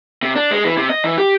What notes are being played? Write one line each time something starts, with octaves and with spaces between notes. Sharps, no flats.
C3
D4
G#3
E3
C3
D#5
E3
G4